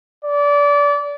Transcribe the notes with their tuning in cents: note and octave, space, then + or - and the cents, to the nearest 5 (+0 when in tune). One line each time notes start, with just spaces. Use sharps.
D5 -25